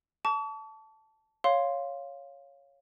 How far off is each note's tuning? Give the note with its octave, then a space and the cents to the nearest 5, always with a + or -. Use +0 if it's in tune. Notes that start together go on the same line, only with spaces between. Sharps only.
A5 -5 C#6 +45
C#5 +0 F5 +0 C6 +0